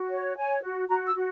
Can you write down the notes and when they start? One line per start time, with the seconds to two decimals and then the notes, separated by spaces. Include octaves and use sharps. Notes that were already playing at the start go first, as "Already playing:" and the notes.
Already playing: F#4
0.11 C#5
0.37 C#5 G#5
0.63 F#4
0.88 F#4 A#5
1.06 E6
1.14 F#4